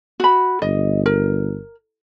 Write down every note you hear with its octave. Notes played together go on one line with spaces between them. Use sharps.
F#4 B5
G1 D#5
A#4